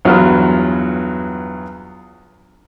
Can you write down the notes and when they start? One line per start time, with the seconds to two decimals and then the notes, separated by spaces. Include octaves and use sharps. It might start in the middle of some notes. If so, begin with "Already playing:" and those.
0.05 E2 G2 F#3 B3 F4 F6